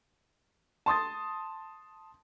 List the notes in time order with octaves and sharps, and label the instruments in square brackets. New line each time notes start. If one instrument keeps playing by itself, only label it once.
[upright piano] A5 C6 D#6 A6